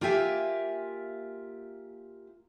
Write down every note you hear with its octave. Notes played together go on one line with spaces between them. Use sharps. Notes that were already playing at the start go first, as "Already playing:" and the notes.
A#3 F4 G4 E5 G5 G#5